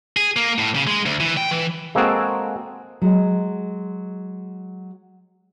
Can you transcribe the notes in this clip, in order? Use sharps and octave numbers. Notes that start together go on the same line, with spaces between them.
G#4
A#3
A2
C#3
G#3
D2
E3
G5
E3
G#3 A#3 C4 F#4 G#4 A4
F#3 G#3